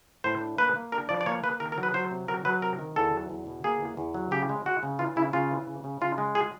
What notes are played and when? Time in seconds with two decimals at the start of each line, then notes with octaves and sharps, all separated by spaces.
0.24 A2 C5
0.42 D4
0.58 A#3 B4
0.76 A#3
0.92 D4 A#4
1.09 F3 D5
1.21 D5
1.26 A#3 C#5
1.44 A#3 B4
1.60 D#3 A#4
1.72 A#4
1.78 F#3
1.83 B4
1.94 F#3 C5
2.11 C3
2.28 F#3 A#4
2.45 F#3 B4
2.62 C3 A#4
2.79 D#3
2.96 E2 A4
3.13 F#3
3.30 E2
3.47 B2
3.64 A#3 G#4
3.81 E2
3.97 E2
4.14 F#3
4.31 C#3 G4
4.49 G#3
4.65 G#3 F#4
4.83 C#3
4.99 E3 F4
5.16 C#3 E4
5.33 C#3 F4
5.51 E3
5.67 C#3
5.84 C#3
6.01 C#3 F4
6.18 G#3
6.35 G#4